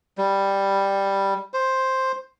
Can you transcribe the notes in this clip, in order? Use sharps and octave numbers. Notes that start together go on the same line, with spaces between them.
G3
C5